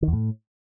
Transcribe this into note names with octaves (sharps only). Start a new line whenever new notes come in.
D#3
E2
A2